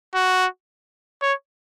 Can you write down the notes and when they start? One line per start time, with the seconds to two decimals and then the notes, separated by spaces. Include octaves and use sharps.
0.15 F#4
1.22 C#5